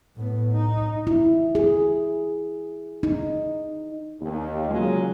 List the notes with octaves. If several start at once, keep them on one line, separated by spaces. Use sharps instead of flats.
A2 B3
D#4
E4
G#4
D#4
D#2
A#2 C#3 F#3 G#3